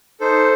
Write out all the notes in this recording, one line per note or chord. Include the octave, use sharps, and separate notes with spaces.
D#4 A4 C5